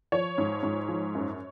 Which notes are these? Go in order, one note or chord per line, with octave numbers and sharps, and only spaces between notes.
F3 C#5
G#2
G#2
F3
F#2